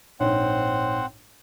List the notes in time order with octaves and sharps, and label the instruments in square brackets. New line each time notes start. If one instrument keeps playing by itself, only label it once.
[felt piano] A#1 G#2 [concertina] C4 C5 F#5 [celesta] C#5